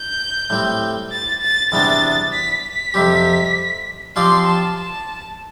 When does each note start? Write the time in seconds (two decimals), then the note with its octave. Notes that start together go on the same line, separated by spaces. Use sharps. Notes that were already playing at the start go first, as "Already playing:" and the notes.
Already playing: G6
0.50 A2 G3 C4
1.11 A6
1.42 A6
1.72 E2 C3 G3 B3 D4 A6
2.33 B6
2.64 B6
2.94 F2 C3 G3 C4 G4
4.16 F3 C4 G4 D5 F5 C6
4.47 A5
4.77 A5